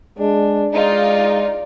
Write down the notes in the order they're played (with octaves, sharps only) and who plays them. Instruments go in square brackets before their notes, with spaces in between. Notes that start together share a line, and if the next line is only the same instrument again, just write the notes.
[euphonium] G#3 [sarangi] D4
[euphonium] G#3 [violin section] D#4 F4 [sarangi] D5